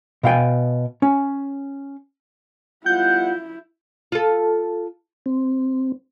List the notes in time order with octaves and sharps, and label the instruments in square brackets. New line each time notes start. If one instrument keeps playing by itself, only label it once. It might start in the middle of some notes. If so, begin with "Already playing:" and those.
[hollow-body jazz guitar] B2 F5 G5 G#5
C#4
[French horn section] G3 B3 F4 [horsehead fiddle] E4 [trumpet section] F#5 [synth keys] G6
[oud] F4 A4
[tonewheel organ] C4